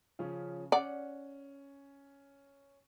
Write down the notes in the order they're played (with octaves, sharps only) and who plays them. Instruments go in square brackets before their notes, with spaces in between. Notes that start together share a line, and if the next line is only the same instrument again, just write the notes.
[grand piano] C#3 F3 C#4
[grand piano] C#4 [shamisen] D5 [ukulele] F#5